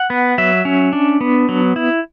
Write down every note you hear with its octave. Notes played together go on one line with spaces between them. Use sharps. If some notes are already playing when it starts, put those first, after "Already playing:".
Already playing: F#5
B3
F#3 E5
C#4
D4
B3
F#3
E4